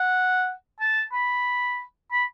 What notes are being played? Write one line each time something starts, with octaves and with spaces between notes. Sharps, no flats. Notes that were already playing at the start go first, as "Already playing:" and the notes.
Already playing: F#5
A5
B5
B5